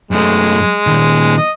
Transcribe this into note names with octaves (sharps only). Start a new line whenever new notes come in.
F#2 G#3 A3
A#2 D#3
D#5